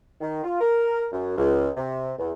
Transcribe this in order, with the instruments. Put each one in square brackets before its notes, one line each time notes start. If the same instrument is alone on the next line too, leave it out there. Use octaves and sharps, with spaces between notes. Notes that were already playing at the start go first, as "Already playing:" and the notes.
[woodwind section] D#3
F4
A#4
F#2
C#2
C3
E2